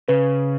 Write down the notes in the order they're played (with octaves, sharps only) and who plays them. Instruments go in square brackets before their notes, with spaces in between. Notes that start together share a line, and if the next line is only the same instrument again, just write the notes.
[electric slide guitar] C#3 [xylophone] B4